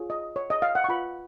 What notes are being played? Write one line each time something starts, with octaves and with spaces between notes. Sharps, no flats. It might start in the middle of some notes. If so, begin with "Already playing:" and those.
Already playing: F4 G#4 C#5
D#5
C#5
D#5
F5
F#5
C#6
F4 B4 B5